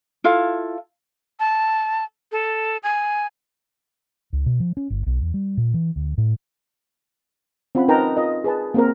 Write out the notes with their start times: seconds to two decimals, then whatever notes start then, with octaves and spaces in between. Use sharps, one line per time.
0.24 E4 F4 A4 F5
1.40 A5
2.32 A4
2.83 G#5
4.33 C#2
4.46 B2
4.60 F3
4.77 C#4
4.90 G1
5.06 B1
5.21 E2
5.34 G3
5.57 A#2
5.74 E3
5.96 D2
6.18 A2
7.75 C4 C#4 F4 F#5 B5
7.88 D#4 A#4 B4 G5 A5 A#5
8.17 F4 A#4 D#5
8.44 G#4 B4 A5
8.74 A#3 C4 A#4